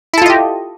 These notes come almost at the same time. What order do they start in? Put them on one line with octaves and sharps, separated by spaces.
E4 A4 F4 D#5 G4